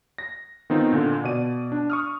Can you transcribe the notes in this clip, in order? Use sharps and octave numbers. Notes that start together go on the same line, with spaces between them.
A#6
D#3 B3 C4 D#4 F4
A#2 D3
B2 D5 D#7
D4
C#6 D#6 F6